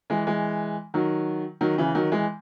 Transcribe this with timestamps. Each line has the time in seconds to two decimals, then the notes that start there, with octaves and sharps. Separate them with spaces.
0.10 E3 G#3
0.27 E3 G#3
0.94 D#3 F#3
1.61 D#3 F#3
1.78 C#3 E3
1.95 D#3 F#3
2.12 E3 G#3